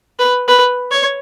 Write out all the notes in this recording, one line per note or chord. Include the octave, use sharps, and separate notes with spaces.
B4
B4
C#5